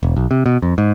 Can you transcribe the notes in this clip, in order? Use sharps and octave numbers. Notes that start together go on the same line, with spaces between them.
E1
B1
C3
B2
F2
G#2